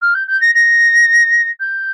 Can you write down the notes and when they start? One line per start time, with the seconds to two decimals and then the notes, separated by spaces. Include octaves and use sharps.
0.01 F6
0.14 G6
0.27 G6
0.40 A#6
0.54 A#6
1.59 G6